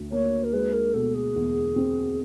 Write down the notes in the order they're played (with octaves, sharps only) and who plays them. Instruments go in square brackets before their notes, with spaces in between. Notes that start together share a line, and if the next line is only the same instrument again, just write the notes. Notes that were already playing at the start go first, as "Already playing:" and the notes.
Already playing: [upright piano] D2
[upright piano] A#3 [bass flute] C#5
[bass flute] A#4
[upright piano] G#3 [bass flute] B4
[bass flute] A#4
[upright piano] B2 [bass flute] A4
[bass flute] G#4
[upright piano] E2
C4